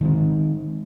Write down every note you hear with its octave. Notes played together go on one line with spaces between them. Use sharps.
D#3 G#3 C4